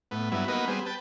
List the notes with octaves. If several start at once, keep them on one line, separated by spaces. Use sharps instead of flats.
A2 B3
G2 F#3 B3 E4
A#3 B3 D#4 F#4 B4
G3 B3 C4 G#4
B4 G5 A5